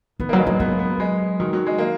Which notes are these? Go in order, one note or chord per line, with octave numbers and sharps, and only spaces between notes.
D#3 B3
F#3 A#3
G#3
F#3 A#3
F#3 B3
B3
G#3
D#3 F#3
F#3
G#3
A#3